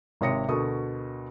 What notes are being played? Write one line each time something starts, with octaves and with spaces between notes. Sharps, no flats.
G#1 C3 C#5 D#6 A#6 C#7
D2 B2 A4 A#4 C#6 D#6